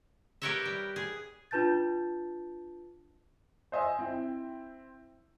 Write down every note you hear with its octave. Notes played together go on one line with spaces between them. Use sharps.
G4 A#4 B4 C#5 D#5 E5
G3
G#4
D4 F4 B4 A5 G6 A6
C5 D#5 E5 G#5
C4 E4 G5